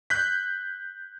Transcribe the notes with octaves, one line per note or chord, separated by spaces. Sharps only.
F#6 G6 B6